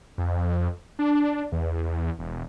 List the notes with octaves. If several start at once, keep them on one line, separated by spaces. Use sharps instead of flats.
F2
D4
E2
E1